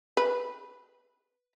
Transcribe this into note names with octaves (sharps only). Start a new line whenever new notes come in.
B4